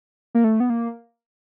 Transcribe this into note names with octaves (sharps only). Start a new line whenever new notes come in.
A#3
A3
B3
A#3